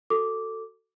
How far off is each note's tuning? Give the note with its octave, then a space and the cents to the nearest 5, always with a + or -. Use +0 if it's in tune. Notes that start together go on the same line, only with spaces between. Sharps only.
F#4 +0 A4 +15 D6 -10